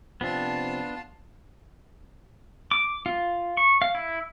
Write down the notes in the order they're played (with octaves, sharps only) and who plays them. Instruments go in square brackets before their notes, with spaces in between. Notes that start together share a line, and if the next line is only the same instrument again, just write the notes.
[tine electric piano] C3 F3 C4 [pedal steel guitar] B3 D4 [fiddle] F4 A5
[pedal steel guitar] D6
F4
C#6
F5
E4